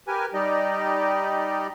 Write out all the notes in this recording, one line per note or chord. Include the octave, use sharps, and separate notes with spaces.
G4 A#4 B4 G#5
G3 D#4 G4 D5 D#5